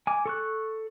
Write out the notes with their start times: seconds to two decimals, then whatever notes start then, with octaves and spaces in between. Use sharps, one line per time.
0.07 G#5 D6
0.26 A4 C#6 F#6